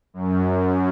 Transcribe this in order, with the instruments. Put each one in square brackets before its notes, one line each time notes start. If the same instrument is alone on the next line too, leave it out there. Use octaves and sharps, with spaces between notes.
[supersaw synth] F#2